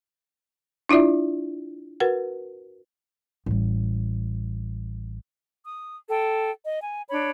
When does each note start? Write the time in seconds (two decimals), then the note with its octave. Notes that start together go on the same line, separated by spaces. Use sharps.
0.89 D4 E4 F4 D5 E5
2.00 F#4 A#4 B4 F#5
3.46 A1 G3
5.67 D#6
6.09 A4 G5
6.65 D#5
6.82 G#5
7.10 D4 C#5 B5